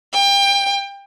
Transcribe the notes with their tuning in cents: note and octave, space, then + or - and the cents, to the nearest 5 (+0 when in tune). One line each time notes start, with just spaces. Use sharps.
G5 +30